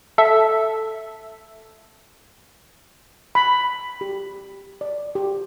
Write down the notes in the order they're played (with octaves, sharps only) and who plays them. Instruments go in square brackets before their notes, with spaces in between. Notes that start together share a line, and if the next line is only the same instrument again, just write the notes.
[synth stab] A4 E5
[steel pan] B5
G4
D5
G4